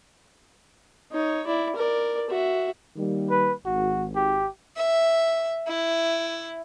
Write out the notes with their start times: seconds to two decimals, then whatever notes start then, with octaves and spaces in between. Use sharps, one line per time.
1.12 D#4 C#5
1.47 E4 D5
1.76 A#4 D5
2.30 F#4 E5
2.96 D#3 G3 A#3
3.30 B4
3.65 G#1 F#4
4.15 G4
4.77 E5
5.67 E4